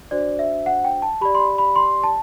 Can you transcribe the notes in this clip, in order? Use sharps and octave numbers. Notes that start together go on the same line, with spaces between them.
D4 F#4 C5 D5
E5
F#5
G5
A5
G4 D5 B5
C6
B5
B5
C6
A5